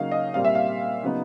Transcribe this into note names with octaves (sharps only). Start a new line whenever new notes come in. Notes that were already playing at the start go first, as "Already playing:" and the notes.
Already playing: C#3 F#3 A#3 D#4 F5
D#5
A#2 G3 C4 F5
E5
F5
C#3 F#3 B3 D#4